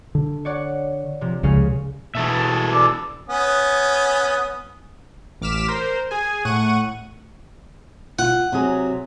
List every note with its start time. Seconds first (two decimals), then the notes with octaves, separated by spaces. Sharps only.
0.15 D3
0.45 C#5 D5 F#5
1.21 C3 F3
1.43 C#2 C#3 C#4 F5
2.15 B2 E3 G#4 A4 E5
2.72 D5 D6 E6
3.29 B3 C#4 D#6
5.41 A1 D6 F6 B6 E7
5.68 A#4 C5
6.11 G#4 G#5
6.45 A2 F#5 C#6 D#7
8.19 F4 F#5
8.52 C3 F#3 G#4